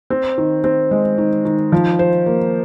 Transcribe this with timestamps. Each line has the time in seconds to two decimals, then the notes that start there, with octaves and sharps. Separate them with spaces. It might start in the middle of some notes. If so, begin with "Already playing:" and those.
0.10 C4
0.38 D#3
0.64 C4
0.91 G#3
1.18 D#3
1.45 D#3
1.72 F3
1.99 C5
2.26 A#3